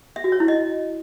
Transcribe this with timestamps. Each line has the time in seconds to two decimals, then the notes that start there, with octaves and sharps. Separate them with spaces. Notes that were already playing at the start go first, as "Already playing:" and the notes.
0.16 E5
0.24 F#4
0.32 C#5
0.40 E4
0.48 D#5